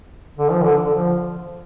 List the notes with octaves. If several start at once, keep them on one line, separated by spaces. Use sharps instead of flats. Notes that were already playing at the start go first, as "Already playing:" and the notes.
D3
F3
D3
D3
F3